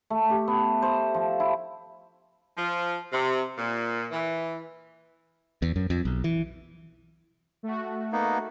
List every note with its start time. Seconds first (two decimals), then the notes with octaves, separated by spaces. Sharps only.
0.10 A3
0.30 G4
0.48 B3
0.82 C5
1.14 F3
1.40 E4
2.57 F3
3.13 C3
3.58 A#2
4.12 E3
5.62 E2
5.76 F#2
5.90 F2
6.05 B1
6.24 E3
7.63 A3 F#4
8.12 A#3 B3 D#4